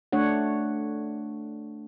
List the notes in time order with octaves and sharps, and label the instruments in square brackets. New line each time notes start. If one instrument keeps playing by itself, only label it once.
[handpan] A3 D4 C#5 F#5